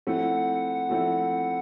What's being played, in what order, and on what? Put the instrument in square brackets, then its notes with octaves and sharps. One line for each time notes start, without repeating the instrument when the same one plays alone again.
[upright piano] F3 A3 C4 E4 [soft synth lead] F#5
[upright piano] F3 A3 C4 E4